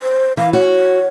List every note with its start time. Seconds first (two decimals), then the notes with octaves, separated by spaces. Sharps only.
0.02 C5
0.37 E3 F5
0.53 F#4 C#5